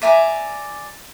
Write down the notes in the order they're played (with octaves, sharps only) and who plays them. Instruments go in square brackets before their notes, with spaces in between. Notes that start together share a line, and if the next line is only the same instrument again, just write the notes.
[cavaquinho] D5 E5 G#5 A#5